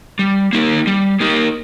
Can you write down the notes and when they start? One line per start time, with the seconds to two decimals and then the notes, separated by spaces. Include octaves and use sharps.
0.19 G3
0.53 A#3 D#4 G4 A#4
0.87 G3
1.20 A#3 D#4 G4 A#4